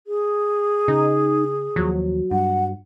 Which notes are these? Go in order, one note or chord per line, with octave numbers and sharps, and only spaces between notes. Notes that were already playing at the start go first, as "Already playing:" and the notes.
G#4
C#3 D#4
D#2 F3 F#3
G2 F#5